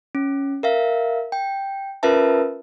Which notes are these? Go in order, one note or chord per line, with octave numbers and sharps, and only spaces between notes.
C#4
A#4 E5 F5
G5
C#4 F4 A#4 B4 E5 A5